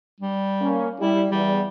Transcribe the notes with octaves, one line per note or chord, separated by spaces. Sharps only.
G3
A#3 C#4
G3 E4
E2 G3